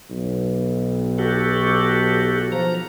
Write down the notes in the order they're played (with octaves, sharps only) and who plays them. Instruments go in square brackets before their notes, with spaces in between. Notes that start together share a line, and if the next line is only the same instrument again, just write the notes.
[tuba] B1
[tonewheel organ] F#4 G4 A4
F3 A#5